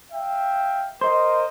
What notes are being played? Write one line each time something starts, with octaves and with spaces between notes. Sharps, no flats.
E5 F5 G5
A#4 C5 D#5